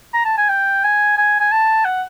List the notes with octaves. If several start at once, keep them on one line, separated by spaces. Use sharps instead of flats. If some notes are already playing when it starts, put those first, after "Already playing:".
A#5
A5
G#5
G5
G#5
G#5
G#5
A5
F#5